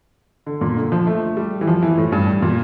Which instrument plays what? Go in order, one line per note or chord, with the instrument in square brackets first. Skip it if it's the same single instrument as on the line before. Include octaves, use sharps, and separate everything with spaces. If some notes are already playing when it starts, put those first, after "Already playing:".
[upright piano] D3
A#2
D3
F3
A3
G3
E3
F3
E3
A2
G2
A#2